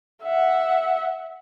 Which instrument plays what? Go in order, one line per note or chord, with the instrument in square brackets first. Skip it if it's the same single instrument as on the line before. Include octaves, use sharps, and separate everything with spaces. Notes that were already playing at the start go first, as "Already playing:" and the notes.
[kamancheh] E5 F#5